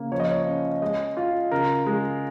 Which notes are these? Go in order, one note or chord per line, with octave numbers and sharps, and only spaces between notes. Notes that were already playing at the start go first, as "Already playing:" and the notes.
Already playing: C#3 A#3
F3 C#5
D#5
C#5
C#4
G#3 D#5
F4
C#3 A#4
G#3